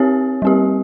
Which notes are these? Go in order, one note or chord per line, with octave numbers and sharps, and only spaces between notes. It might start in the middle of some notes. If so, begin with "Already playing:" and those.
Already playing: C4 G4 C#5
G3 C4 G4